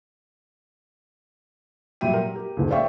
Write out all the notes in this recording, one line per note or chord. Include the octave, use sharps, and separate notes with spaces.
A#2 F#3 G3 E5 G5 D#7
A#4
G4
D#1 C#2
C5 D5 E5 F5 G5 C#6